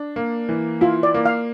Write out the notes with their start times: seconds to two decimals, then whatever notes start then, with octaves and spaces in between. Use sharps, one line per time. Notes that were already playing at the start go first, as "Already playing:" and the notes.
Already playing: D4
0.16 A#3
0.49 E3
0.81 E4 F4
1.03 D5
1.15 A#3
1.26 F5